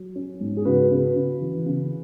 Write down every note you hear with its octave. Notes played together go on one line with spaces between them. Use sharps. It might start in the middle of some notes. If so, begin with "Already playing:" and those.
Already playing: F#3
C#4
G#2
G#4
C#3 F#4 B4
C#3
C#3
E3
C#3